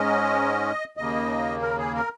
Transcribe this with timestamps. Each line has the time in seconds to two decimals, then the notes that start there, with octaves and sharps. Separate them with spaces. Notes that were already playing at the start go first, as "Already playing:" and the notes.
Already playing: G#2 G#3 C#4 D#5
0.97 D#2 C#3 A#3 D#5
1.62 A#4
1.78 G#4
1.94 A#4